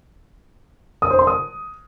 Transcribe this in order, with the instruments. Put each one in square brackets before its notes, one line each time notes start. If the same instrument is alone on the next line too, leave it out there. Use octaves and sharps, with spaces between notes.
[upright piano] D#6
C5
C6
D#6